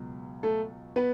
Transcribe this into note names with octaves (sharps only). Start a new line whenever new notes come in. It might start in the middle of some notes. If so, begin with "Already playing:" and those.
Already playing: C#2 B2 F#3
A3 A4
B3 B4